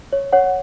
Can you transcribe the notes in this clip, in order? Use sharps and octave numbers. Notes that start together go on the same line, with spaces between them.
C#5
C#5 F#5